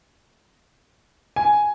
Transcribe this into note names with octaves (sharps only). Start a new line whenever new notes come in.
G#5